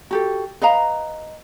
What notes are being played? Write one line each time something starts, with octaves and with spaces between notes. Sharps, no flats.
F#4 G4 A4
B4 D#5 F5 A#5